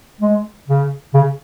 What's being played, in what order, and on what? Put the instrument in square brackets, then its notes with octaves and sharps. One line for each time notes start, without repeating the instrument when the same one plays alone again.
[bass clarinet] G#3
C#3
C#3